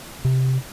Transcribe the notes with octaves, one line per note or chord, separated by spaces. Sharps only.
C3